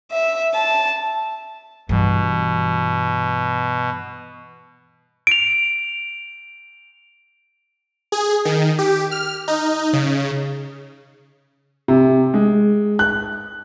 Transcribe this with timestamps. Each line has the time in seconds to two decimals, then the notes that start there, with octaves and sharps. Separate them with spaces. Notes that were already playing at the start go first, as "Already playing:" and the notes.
0.12 E5
0.55 A5
1.89 G2 B2 E3
5.27 D7 F7
8.12 G#4
8.45 D#3
8.79 G4
9.11 F6
9.48 D#4
9.93 C#3
11.88 C3
12.34 G#3
12.99 F#6